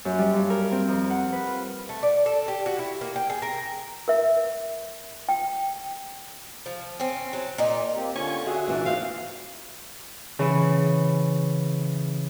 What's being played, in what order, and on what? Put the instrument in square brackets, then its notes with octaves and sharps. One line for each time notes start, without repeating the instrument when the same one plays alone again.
[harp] F#2
G3
G2
A#4
C4
F2
F#5
B4
F4
[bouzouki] A3
D5
A4
G4
F#4
E4
A#3
G5
G#4
A#4
[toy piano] A#4 E5
G5
[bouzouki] F3
C4 C#4
F#3
A#2 D#4
[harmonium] A#3 C4 G4
[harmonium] D3 F4 [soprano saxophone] C#4 [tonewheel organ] G#5 C#6
[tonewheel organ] F#4 E5 [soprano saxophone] G#4
[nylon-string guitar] A#2 E3 D4 [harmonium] D#4
[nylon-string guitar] C4 [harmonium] C5 [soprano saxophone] F5
[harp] C#3 E3